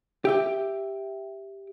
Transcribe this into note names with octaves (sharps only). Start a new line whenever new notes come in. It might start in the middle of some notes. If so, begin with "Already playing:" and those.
G4 E5 G5